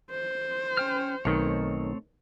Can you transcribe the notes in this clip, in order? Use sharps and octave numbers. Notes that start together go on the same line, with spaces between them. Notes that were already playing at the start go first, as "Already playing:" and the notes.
C5
C#4 G5 F6
B1 D#3 A3 C4 C#5